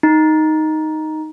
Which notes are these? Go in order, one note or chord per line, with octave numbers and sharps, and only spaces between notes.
D#4